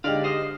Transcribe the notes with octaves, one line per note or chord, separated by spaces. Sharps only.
D3 G#3 D#4 G4 D5 F5
C5 D#5